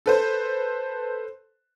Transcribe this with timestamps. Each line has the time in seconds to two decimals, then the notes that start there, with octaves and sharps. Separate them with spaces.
0.06 A4 B4 C5